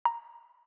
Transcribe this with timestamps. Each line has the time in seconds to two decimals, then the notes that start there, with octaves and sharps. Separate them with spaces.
0.05 A#5